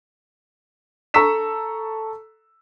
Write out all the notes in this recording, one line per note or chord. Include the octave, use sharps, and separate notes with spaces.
A4 A#5 C#6 E6 B6 E7